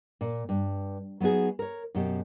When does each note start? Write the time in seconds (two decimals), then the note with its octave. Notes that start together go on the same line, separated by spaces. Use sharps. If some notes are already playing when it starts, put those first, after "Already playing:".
0.21 A#2
0.49 G2
1.20 F#3 B3 D#4 F#4 G#4
1.59 A#4 C#5
1.95 F#2 B2 G4